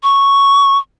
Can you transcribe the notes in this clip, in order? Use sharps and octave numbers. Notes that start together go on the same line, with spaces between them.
C#6